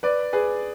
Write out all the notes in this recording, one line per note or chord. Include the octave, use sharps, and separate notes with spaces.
B4 D5
G#4 B4